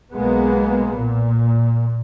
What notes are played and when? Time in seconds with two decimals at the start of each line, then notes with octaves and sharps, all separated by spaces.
0.15 B1 G#3 A#3 B3
0.99 A#2